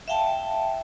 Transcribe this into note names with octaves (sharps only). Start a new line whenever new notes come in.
E5 F5 G5 A5